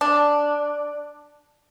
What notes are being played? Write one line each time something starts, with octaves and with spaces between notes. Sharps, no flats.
D4